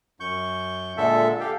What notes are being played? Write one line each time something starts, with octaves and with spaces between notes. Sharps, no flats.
F#2 C#6 G6
A#2 D3 G#3 A4 E5
G4 A4 F5 G5